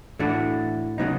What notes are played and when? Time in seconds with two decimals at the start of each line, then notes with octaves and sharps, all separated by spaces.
0.19 A2 E3 A3 D4 F#4
0.98 C#3 F#3 B3 D#4